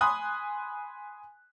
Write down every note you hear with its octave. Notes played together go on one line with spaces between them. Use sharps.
G#5 B5 C6 D#6 F#6